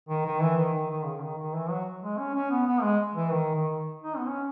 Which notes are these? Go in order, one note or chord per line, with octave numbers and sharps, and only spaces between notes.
D#3
D#3
E3
D#3
D#3
D#3
C#3
D#3
D#3
E3
F#3
G#3
C#4
C#4
B3
B3
G#3
E3
D#3
D#3
D#4
B3
C#4